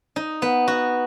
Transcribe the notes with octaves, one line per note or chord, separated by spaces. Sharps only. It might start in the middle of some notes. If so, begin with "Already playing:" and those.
D#4
B3
F#4